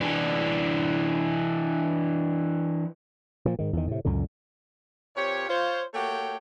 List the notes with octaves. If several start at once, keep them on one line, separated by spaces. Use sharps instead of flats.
E3 D4
A#2 F3
G#2 D#3
E2 D#3
A2 C3
C#2 F#2 A#2 D3
A#2 C4 G4 C#5
F4 C5 C#5
A3 A#3 F#4 G4 C#5 G5